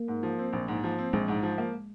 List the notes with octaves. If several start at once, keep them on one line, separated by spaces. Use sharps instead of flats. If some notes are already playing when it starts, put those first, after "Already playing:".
Already playing: A#3
G#2
F3
C4
A#1
G#2
F3
C4
A#1 G#3
G#2
F3
A#3